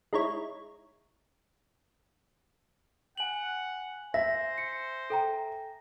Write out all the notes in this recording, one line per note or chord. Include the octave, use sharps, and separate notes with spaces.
G#3 D#4 E4 C#5
F#5 G#5 F#7
C5 E5 A#6
C#7
A4 G5 A#5